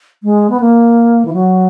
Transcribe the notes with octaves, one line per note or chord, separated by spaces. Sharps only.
G#3
B3
A#3
E3
F#3